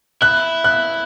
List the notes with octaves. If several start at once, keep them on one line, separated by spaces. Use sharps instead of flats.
E4 F#6
F#6